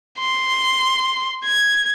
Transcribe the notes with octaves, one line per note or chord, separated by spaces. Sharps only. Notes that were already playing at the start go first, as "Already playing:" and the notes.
C6
G#6